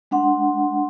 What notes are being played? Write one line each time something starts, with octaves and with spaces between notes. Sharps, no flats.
G#3 D4 F#5 C6